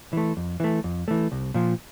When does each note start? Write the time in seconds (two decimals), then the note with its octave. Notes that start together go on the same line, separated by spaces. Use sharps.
0.13 E3 A3
0.37 F2
0.60 E3 A3
0.84 F2
1.08 E3 A3
1.32 C2
1.54 A#2 F3